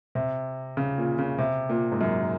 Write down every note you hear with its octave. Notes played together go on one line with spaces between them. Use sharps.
C3
C#3
A#2
C#3
C3
A#2
G#2
F#2